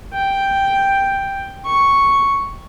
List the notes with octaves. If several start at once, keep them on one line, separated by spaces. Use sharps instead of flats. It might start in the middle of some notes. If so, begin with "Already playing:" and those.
G5
C#6